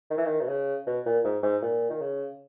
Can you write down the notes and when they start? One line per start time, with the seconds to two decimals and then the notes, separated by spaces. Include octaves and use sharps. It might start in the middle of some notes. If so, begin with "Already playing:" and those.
0.10 D#3
0.18 E3
0.25 D#3
0.41 B2
0.48 C#3
0.87 B2
1.06 A#2
1.24 G#2
1.43 G#2
1.62 A#2
1.90 D#3
2.01 C#3